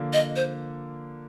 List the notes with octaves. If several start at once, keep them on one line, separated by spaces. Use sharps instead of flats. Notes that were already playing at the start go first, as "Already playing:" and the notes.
Already playing: D3 F3 A#3
D#5
C5